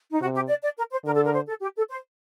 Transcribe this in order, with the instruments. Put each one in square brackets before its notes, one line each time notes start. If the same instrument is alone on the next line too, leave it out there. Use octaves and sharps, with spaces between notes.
[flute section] D#4
[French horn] C3 [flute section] F#4
[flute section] G4
D5
D5
A#4
C5
[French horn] D3 [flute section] A#4
[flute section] A4
A#4
C5
A4
G4
A4
C5